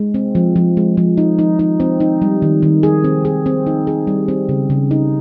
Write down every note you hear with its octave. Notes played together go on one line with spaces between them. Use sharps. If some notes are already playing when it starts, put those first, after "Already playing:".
Already playing: G#3
C4
F3
F3
G#3
F3
D#4
D#4
D#4
C4
D#4
G3
D#3
D#3
G#4
C4
G#4
C4
D#4
G#4
G3
C4
C#3
C#3
D#4